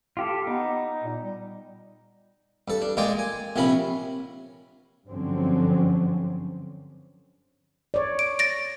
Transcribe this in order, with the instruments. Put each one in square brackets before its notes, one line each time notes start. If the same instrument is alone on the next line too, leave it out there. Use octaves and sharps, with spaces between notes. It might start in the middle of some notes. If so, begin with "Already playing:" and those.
[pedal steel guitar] F4 G4 A4
[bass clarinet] B3 [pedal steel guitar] D#4
[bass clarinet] A#2
G3
[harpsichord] G2 A4
D4
A#2 G#3 F4 D5 D#5 G5
G#5
A#1 C3 F3 C#4 A#4 B5
[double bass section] G2 D3 F3 F#3 C4 C#4
[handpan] C#5 D5
[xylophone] D7
A6 A#6 D7